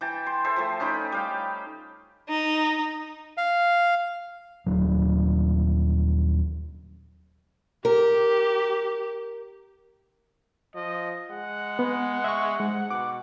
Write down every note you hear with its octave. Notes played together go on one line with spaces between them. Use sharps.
E3 G5 A5
C6
A4 C5 E5
F3 A3
C#4 D#4 G5 B5
G3 F5 G5
D#4
F5
D#1 F#3
G4 A#4
F3 D#5
G#3 F#5
B3
E5 C#6
G#2 G#3
B2 D6